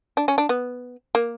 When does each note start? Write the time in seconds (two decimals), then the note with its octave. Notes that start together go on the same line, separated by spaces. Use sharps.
0.17 D4
0.28 C#4
0.38 D4
0.49 B3
1.15 A#3